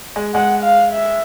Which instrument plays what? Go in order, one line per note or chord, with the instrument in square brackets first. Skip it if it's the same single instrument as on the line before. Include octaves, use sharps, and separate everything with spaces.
[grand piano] G#3
[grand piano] G#3 [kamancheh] F#5
[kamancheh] F5
E5